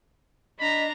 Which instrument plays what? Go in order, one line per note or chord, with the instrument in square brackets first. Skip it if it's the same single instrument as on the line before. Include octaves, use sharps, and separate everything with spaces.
[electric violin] D4 A#5 [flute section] D#5 [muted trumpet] B5